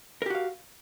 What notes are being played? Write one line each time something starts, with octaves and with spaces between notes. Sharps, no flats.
F#4 G4 A#4 F5